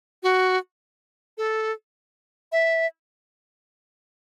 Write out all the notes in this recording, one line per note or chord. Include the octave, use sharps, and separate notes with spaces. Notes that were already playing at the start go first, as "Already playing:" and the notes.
F#4
A4
E5